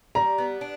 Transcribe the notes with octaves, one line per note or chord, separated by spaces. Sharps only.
G3 A#5
B3
D4